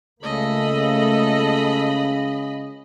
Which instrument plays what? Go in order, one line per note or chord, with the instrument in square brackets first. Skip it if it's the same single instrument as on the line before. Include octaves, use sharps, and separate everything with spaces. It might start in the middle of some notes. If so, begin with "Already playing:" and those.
[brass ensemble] C#2 C#3 [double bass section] A3 A#3 [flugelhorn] A4 [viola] D#5 B5